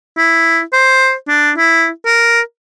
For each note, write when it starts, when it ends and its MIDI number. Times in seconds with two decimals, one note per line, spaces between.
0.17 0.61 64
0.73 1.14 72
1.28 1.51 62
1.58 1.89 64
2.06 2.40 70